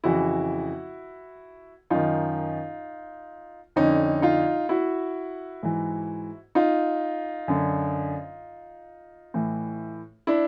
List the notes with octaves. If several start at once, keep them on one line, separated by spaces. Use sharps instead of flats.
F2 C#3 E3 E4 F#4
F#2 D#3 D#4 F4
F2 D3 C#4 D#4
D#4 F4
E4 F#4
G#2 E3
D#4 F4
F#2 D3
A2 E3
D4 E4